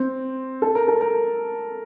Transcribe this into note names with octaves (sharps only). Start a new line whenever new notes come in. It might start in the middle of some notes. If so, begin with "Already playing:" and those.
Already playing: C4
A4
A#4
A4
A#4